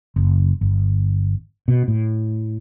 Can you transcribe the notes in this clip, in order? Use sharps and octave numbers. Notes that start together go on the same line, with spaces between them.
F#1
G1
B2
A2